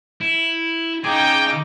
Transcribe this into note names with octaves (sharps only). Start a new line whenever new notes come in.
E4
C#3 D#4 G#4 G5 D6